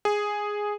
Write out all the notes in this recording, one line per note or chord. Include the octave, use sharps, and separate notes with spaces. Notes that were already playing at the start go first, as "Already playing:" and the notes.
G#4